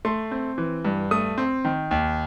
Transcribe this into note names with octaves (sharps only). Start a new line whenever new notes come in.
A3 C6
C4
E3
G2
A3 D#6
C4
D#3
D#2